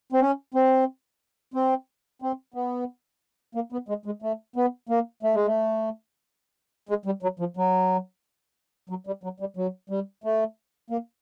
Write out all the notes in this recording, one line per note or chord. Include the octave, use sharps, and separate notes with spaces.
C4
C#4
C4
C4
C4
B3
A#3
B3
G#3
G#3
A3
B3
A#3
A3
G#3
A3
G#3
G3
F#3
F3
F#3
F#3
G3
F#3
G3
F#3
G3
A3
A#3